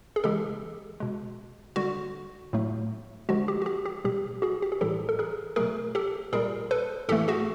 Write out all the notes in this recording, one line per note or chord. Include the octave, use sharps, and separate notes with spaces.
G#4
C#3 E3 G#3 G4 A4
B2 G#3
D3 G3 F#4
A2 F#3 A3
D3 F3 G#3 F#4
G4
F#4
G4
G4
B2 G3 G4
F#4 G#4
G4
G#4
A2 E3 G3 G4 A4
A4
G#4 A#4
B2 F#3 A3 G#4 A#4
G4 A4
A#2 G3 G#4 A#4
A4 B4
A2 E3 A3 G4 A4
F#4 G#4